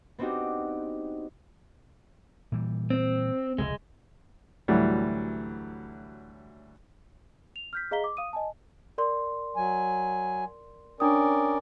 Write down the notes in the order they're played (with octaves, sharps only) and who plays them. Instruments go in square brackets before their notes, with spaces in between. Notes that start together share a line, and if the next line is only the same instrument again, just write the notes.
[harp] B3 C4 D4 D#4 F#4 G4
[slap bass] A#2 E3 G3
[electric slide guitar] C4
[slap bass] F1 C#2 [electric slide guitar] G#3
[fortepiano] D2 A2 E3 F#3 G3
[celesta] F7
F6 G6 B6
G#4 D#5 F5 A#5 B6 G7
D6
F5 D#6 D#7
D#5 G#5 A5
A#4 D5 C6
[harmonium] F#3 G#5
[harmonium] C#4 A#4 D5 [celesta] D4 G5 D#6